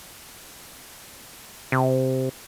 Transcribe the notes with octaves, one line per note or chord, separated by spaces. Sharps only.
C3